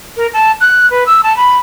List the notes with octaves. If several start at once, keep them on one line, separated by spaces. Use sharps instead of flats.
A#4
A5
F#6
B4
E6
A5
B5